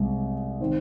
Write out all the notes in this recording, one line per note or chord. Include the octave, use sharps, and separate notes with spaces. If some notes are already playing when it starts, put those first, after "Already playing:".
Already playing: C2 C3 G#3
D#3 C4